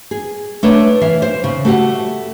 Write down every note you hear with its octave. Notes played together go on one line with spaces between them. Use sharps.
G#4
A3 D4 B4 C#5
E3 E5 F5
C5
C#3
A3 F#4 G4 E5 F#5